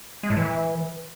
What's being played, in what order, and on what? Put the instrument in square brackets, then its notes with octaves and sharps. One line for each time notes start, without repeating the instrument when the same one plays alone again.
[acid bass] G#3
A2
E3